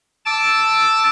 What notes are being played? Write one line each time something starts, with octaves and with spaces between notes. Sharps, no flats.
A5 D6 E6